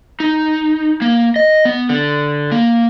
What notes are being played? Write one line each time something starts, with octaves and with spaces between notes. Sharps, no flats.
D#4
A#3
D#5
B3
D3
A#3